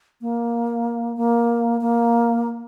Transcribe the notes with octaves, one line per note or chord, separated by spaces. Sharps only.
A#3
A#3
A#3